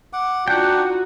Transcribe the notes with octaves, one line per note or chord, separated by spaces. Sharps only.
F#5 D6
D4 D#4 F4 F#4 F#5 G5